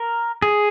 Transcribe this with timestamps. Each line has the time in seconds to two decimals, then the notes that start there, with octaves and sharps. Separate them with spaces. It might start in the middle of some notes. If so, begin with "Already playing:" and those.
Already playing: A#4
0.42 G#4